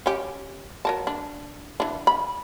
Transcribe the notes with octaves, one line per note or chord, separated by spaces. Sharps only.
C#4 G4
F#3 A#4 A5
D4
E3 D4
B5